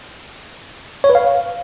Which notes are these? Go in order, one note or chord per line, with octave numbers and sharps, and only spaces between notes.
C#5
B4
F5